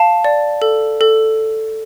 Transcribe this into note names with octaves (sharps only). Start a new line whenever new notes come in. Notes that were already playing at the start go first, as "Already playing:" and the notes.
Already playing: F5 A5
D5
A4
A4